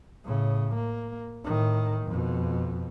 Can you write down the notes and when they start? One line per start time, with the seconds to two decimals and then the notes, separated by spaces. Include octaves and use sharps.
0.24 A2 C#3
0.75 A#3
1.44 A2 D#3
2.06 F2 B2